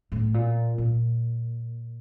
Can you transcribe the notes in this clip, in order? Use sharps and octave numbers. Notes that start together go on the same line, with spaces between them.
A2
A#2
A#2